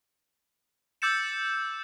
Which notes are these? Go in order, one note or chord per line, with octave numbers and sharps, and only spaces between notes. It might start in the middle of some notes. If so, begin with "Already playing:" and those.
D6 E6 G6 A6 C#7 E7